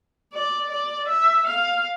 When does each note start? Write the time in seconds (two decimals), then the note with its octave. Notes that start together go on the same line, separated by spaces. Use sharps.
0.33 D5
0.71 D5
1.09 E5
1.48 F5